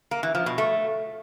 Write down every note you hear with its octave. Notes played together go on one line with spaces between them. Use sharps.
A#3
E3
F3
B2
A3